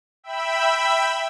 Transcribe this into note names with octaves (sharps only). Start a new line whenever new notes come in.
E5 G5 B5 E6